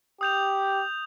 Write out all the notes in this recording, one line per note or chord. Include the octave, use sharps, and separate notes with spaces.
G4 D#6 G6 F7